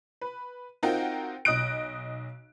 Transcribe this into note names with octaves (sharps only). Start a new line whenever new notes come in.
B4
C4 D#4 F4 F#4 A#4 G5
B1 D#5 D#6 F#6 D7